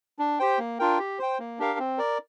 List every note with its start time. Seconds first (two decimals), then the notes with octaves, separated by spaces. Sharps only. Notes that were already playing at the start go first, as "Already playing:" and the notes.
0.19 D4
0.39 G4 C5 G5
0.58 A#3
0.79 D4 F4 A#4 G5
0.99 G4
1.18 C5 G5
1.39 A#3
1.59 D4 G4 A#4 F5
1.79 C4
1.98 A#4 D5